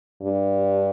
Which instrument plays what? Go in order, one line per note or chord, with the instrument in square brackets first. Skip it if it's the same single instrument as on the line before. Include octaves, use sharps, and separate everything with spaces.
[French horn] G2